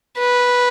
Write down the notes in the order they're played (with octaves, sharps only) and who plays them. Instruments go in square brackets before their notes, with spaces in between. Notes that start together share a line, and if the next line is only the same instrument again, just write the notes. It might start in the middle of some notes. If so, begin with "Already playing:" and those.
[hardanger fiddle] B4